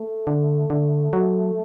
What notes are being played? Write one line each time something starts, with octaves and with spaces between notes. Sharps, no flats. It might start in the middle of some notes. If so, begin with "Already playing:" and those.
Already playing: A3
D3
D3
F#3